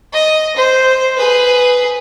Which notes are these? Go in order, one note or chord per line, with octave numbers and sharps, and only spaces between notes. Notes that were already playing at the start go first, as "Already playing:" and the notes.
D#5
C5
G#4 B4